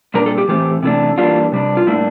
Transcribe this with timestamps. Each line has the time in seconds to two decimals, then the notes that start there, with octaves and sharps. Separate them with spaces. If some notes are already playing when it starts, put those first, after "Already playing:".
0.14 A#2 G3 D4 A#4
0.26 A4
0.38 G4
0.48 A2 E3 A3 C4 G4
0.83 C3 E3 A3 D4
1.18 E3 G3 A#3 D4 F4
1.52 C3 G3 D4
1.77 F4
1.87 A2 G3 A#3 D4 E4